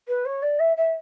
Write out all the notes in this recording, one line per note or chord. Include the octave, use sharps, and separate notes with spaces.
B4
C#5
D5
E5
E5